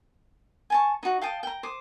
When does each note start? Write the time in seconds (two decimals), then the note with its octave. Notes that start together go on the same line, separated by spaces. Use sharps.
0.70 G#5 A5 C#6
1.03 D#4 F#4
1.21 F5 G5 A5 D#6
1.43 G5 A#5
1.63 C5 D6 D#6